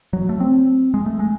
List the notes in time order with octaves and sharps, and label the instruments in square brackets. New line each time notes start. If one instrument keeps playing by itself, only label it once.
[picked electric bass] F#3
A3
C4
G#3
A3
G#3